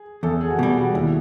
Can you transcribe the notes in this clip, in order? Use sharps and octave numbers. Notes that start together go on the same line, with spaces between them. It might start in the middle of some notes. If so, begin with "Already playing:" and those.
Already playing: G#4
E2 A4
G#4
F#4
B2 G3 G4
F#4
D#2 E4